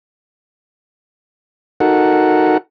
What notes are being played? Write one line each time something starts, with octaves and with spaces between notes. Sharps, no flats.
D#4 F#4 A4 A#4 F#5